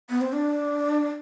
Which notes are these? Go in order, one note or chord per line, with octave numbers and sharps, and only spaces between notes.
B3
C4
D4